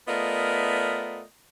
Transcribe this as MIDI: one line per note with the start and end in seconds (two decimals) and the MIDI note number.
0.08 1.22 57
0.08 1.22 59
0.08 1.22 65
0.08 1.22 70
0.08 1.22 74
0.08 1.22 75